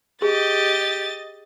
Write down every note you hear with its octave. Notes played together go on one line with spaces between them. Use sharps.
G4 G#4 D#5 A6